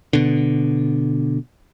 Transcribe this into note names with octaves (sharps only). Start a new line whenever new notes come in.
B2 D3